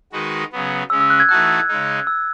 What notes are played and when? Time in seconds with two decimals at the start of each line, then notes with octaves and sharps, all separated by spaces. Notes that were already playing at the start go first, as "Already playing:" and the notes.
0.12 D#3 G#3 D#4 F#4 B4
0.52 C#3 F#3 B3
0.90 C#3 G#3 C#4 E6
1.00 E6
1.10 F#6
1.20 G#6
1.29 E3 A3 D#4 F#4 A4 F#6
1.68 C#3 G#3 D#4
2.07 E6